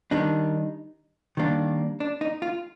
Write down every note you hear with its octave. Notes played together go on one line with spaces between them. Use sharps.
D#3 G3 D4 D#4
D#3 G3 A#3 D4
D4
D#4
F4